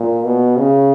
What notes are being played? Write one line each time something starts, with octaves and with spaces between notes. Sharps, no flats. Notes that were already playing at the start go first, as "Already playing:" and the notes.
Already playing: A#2
B2
C#3